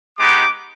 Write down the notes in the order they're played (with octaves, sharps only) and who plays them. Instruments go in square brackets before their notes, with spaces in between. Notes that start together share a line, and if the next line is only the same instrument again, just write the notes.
[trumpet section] G#3 B3 D#4 G4 D6